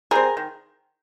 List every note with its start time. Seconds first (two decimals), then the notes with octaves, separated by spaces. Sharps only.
0.11 G3 C4 G#4 A#4
0.37 D#3